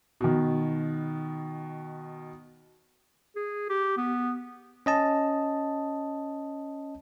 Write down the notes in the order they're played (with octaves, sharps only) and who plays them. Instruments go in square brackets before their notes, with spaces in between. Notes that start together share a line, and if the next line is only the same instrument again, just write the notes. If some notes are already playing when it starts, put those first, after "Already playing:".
[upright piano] B2 D#3
[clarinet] G#4
G4
B3
[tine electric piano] C#4 D#5 A5